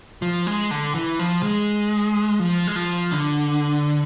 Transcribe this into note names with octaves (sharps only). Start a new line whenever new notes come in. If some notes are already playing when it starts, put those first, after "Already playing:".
F3
G#3
D3
E3
F3
G#3
F3
G#3
F3
D3